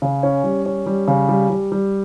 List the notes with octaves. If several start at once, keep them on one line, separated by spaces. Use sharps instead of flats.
C#3
C#4
G3
C#4
G3
C#3
G3
G3
G3